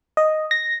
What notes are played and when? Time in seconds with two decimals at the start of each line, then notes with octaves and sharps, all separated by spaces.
0.17 D#5
0.51 A#6